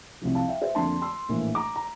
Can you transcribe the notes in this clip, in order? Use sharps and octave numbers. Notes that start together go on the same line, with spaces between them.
C2 C3 F3
F5 A5
E5 G5
C5 E5
F2 D3 F3 A#3 D4 A5 C6
C6 E6
A#1 A2 E3 A#3
A#5 D6
A#5